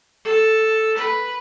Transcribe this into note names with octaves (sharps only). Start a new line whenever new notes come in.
A4
B4